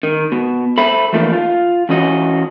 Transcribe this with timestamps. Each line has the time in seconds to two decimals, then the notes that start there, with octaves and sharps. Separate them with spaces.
0.03 D#3
0.32 B2
0.78 A4 C5 E5 B5
1.13 E3 F3 A3 A#3 D#4
1.33 F4
1.89 E3 C#4 F#4 D#5